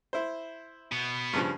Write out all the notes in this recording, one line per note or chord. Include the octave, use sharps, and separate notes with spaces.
E4 C5
B2 B3
G2 C#3 F3